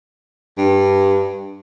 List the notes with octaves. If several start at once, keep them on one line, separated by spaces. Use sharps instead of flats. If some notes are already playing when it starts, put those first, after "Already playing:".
G2